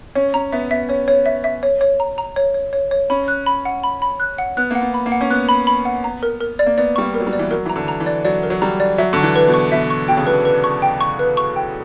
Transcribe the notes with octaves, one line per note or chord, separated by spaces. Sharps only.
C#4 C#5
C#4 A#5
B3 E5
B3 E5
C#4 C#5
C#5
E5
E5
C#5
C#5
A#5
A#5
C#5
C#5
C#5
C#5
C#4 B5
F#6
B5
F#5
B5
B5
F#6
F#5
B3 F#6
A#3 F#5
B3
B5
A#3
F#5
C#4
B3 F#6
B5
B5
F#5
A#5
A#4
A#4
D5
A#3
B3 D5
G3 C#6
A#3
A#4
F#3
G3
D5
E3
F#3 A#4
E3 A#5
D3
A#5
E3
D5
F#3 D5
A#4
F#3
G3 A#5
D5
F#3 E5
D3 C#6
E3
B4
B2
C#6
B2 E5
C#6
B2 G5
C#3
B2 B4
B4
C#6
G5
C#6
B4
C#6
G5